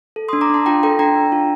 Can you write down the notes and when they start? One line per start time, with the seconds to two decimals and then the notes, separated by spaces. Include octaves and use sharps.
0.16 A4
0.29 D4 C6 D#6
0.41 A#5 D6
0.50 D4 A5 C6
0.66 F4 G5 A#5
0.83 A4 G5 A#5
0.99 D4 G5 A#5
1.15 D4
1.32 F4